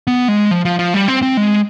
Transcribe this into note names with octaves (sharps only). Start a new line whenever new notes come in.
B3
G#3
F3
F3
F3
G3
C4
C4
G#3